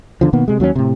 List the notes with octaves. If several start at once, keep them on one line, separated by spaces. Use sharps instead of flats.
E2 D3 F3
B2 D#3 A#3 B3
C3 G#3
D#2 F#3 A3 C#4
A2 C3